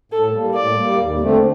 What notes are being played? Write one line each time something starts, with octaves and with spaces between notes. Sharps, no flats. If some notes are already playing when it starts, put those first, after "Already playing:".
A2 A4
G3 A#3
A2 D5
G3 A#3
D#2
D3 A3 C4